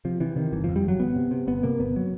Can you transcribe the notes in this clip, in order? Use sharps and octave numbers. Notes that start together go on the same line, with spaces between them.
C3 F3
C3 E3
C3 D#3
G1 E3
F2 F3
G3
G1 F#3
G1 B3
C3
C3
G1 B3
C3 A#3
G1 B3
F#3